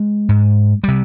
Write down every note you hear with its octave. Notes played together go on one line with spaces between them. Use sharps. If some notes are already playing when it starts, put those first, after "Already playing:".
Already playing: G#3
G#2
C3 G3